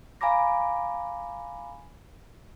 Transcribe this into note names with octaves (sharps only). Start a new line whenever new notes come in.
F5 G#5 A#5 B5 D6 A#6